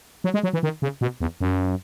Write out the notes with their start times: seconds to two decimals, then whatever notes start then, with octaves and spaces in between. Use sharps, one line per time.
0.24 F#3
0.34 G#3
0.43 F#3
0.53 E3
0.63 D#3
0.82 C#3
1.01 B2
1.21 E2
1.41 F#2